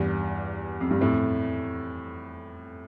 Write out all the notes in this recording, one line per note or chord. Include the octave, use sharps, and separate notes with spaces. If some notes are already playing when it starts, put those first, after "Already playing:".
Already playing: E2 G2
F2
G2
F2 A2